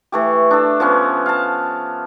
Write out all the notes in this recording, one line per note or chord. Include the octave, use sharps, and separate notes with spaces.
E3 A3 G4
D4 A4
F3 B3 C#4
F5 A5